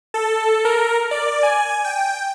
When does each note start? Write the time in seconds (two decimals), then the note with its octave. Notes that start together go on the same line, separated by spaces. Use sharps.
0.14 A4
0.65 A#4
1.11 D5
1.43 G#5
1.85 G5